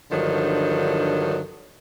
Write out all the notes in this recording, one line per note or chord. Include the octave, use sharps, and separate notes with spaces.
G2 D3 D#3 F3 F#3